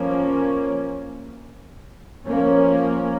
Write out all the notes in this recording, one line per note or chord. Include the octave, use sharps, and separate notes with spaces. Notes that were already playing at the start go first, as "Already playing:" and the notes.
Already playing: F3 A#3 C#4
F3 A#3 C#4